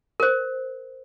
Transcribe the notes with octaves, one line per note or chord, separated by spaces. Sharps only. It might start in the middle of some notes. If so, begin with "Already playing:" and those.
A#4 C5